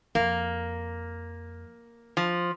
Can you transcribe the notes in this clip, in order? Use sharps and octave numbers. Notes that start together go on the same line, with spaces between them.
F2 A#3
F3